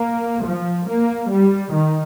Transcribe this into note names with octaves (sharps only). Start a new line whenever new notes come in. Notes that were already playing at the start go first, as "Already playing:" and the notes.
Already playing: A#3
F3
A#3
G3
D#3